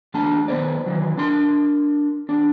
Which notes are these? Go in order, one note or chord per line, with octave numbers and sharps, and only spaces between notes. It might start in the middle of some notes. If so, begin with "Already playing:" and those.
E2 A3 D4 A5
D#3 B3 C5 D5
D#3 E3 F#3
D4 A#4 C6
E2 D4